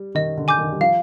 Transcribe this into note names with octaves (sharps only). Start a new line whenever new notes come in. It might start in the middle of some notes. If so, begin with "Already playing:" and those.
Already playing: G3
D#3 D#5
D3
G#5 D6 G6
D#3
G3
F3 F5